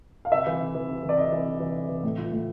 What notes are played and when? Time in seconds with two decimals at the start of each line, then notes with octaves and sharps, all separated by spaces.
0.25 F5
0.32 C3 E5
0.47 E3
0.61 C3
0.75 E3
0.89 C3
1.03 E3
1.09 D5
1.18 C3 D#5
1.32 E3
1.46 C3
1.60 E3
1.75 C3
1.89 E3
2.03 A2
2.18 F3
2.32 A2